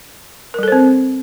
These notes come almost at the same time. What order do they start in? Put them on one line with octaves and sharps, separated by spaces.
A#4 G3 A4 C5 C4